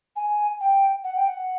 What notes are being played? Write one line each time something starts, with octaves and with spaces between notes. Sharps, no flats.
G#5
G5
F#5
G5
F#5